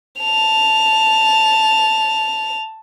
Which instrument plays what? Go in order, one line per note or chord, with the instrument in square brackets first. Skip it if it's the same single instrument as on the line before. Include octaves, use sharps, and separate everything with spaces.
[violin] A5 F7